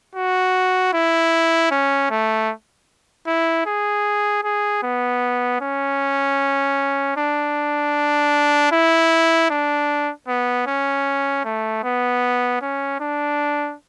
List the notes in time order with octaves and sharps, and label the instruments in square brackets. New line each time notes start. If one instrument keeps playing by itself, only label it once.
[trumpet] F#4
E4
C#4
A3
E4
G#4
G#4
B3
C#4
D4
E4
D4
B3
C#4
A3
B3
C#4
D4